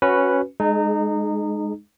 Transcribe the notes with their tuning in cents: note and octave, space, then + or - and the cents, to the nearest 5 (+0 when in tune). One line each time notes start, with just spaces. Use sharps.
C#4 -5 F#4 +0 B4 +0
G#3 +0 D#4 -25 G#4 +35